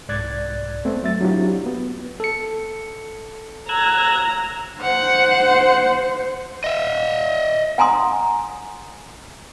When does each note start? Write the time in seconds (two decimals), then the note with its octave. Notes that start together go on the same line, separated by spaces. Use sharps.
0.08 C2 G#2 D5 F#6 G#6 A6
0.85 A3 B3 C4
1.03 F#3 E5 A6
1.21 F#3 C4 D4 E4 F4 G4
1.66 B3
2.20 A4 C#7
3.69 A#5 E6 F#6 G#6
4.82 C5 F#5
6.64 D#5 E5
7.78 F#5 G#5 A#5 C6 D#6